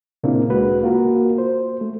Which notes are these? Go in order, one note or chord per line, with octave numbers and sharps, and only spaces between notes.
A#2 C#3 A#3 C4 D4 E4
D2 G#3 F#4 B4
A#3 F4 F#4 A#4
C5
A3